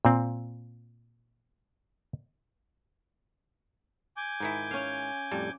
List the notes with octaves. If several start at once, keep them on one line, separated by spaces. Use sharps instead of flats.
A#2 C4
G#5 D6 G6
G#2 D#3 E4
C#4 F5
F2 A2 G3